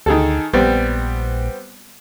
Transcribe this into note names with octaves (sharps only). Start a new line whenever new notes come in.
D2 D#3 G#4 A4
A#1 G3 B3 C4